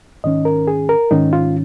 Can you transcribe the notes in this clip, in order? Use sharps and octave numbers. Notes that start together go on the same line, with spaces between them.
G#2 D#3 C#4 D#5
A#4
G#4
A#4
G#2 D#3 C#4 D#4
F4